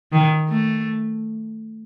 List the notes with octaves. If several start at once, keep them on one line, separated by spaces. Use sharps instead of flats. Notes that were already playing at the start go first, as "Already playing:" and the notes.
D#3
A3